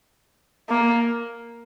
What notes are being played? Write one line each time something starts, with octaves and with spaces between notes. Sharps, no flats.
A#3